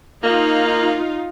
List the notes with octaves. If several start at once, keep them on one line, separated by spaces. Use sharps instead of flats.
A#3 D#4 F4 F5